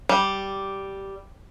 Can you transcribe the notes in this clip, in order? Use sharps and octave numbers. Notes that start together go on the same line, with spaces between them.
G3